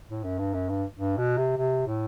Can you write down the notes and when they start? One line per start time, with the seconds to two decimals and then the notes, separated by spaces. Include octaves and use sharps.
0.09 A2
0.24 F#2
0.38 G2
0.54 F#2
0.69 G2
0.98 G2
1.17 B2
1.37 C3
1.57 C3
1.87 A2